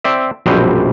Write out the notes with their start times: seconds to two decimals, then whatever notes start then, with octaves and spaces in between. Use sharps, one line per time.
0.04 C4 D5 E5
0.46 A#1 F#2 B2 G3 C4 G4